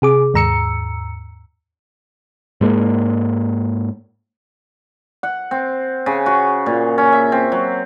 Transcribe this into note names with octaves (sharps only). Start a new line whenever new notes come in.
C3 G#4 D6
D#2 G#2 A#5 E6 C#7
G#2 G#3 A#3
F#5
C4
C#3
F#4
A#2
C#4
E5
C4
F#3